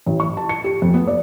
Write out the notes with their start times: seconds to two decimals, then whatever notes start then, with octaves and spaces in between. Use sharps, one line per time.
0.06 A1
0.20 C#6
0.37 A5
0.49 C#7
0.64 G4
0.82 F2
0.94 B3
1.07 D5